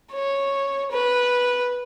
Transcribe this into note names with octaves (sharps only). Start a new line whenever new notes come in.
C#5
B4